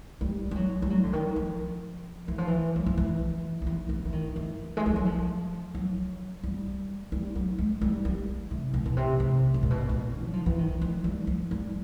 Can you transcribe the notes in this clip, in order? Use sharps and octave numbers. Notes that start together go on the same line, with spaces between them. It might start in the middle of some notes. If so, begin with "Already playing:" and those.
G3
G3
F#3
G3
F#3
D3
D#3
F3
E3
F3
E3
F#3
F3
E3
F#3
F3
E3
E3
D#3
E3
G#3
G3
F#3
F3
F#3
G3
G3
F#3
G#3
G3
G3
C3
B2
B2
C3
C3
B2
A#2
B2
A#2
F#3
F3
E3
D#3
F3
G3
F3
G3